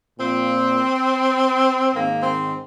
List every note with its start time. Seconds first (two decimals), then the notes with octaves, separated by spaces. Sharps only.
0.18 A#2 F3 C4
1.94 G#2 D#3 A#3
2.23 C4